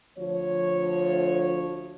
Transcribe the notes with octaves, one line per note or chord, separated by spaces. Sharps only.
D2 F3 C#5